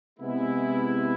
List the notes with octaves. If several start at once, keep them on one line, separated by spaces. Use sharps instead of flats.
C3 G#3 B3 E4